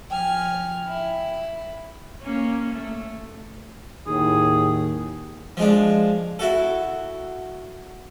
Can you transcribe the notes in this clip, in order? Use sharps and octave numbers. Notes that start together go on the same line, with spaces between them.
F3 G5 G#5 F6
E4
A#3 C#4
A3
D#2 A2 G#4
F3 G#3 D4
E4 F#4 A4